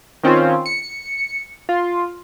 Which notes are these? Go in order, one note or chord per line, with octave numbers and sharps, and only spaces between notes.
D#3 C4 C#4 F4
C#7
F4